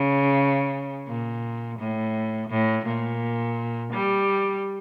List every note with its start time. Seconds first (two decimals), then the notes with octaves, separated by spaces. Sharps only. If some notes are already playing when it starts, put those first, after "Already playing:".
Already playing: C#3
1.08 A#2
1.79 A2
2.50 A2
2.86 A#2
3.93 G3